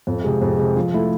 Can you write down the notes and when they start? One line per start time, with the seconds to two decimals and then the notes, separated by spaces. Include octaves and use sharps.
0.07 F2
0.24 C3 G#3
0.42 F2
0.59 C3 G#3
0.77 F3
0.94 A3 E4 A4